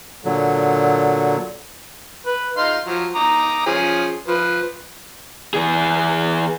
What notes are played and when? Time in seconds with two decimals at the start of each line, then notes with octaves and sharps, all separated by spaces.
0.25 A#2 D3 F#3
2.26 B4
2.57 D#4 F5 C6
2.86 F3 F#3
3.15 A#5 D6 D#6
3.66 F3 C#4 G#4
4.28 F3 B4
5.54 E3 G#4